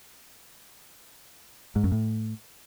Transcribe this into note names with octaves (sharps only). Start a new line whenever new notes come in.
G#2
F#2
A2